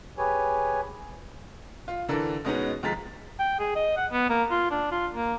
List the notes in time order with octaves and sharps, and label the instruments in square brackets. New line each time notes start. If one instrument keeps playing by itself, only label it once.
[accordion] G4 G#4 B4 C#5 G#5
[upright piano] F4
D3 E3 D4 A4 A#4
B2 G#3 B3 C#4 D#4 F#4
D#2 F3 G#3 A#5 A6 B6
[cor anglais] G5
G#4
D#5
F#5
B3
A#3
F4
D4
F4
A#3